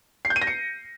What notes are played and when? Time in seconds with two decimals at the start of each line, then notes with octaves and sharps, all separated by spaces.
0.25 C7
0.30 G6
0.36 D#7
0.42 A#6
0.47 C#7